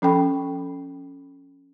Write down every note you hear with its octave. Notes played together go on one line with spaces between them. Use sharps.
F3 C#4 A4 G5 B5 C#6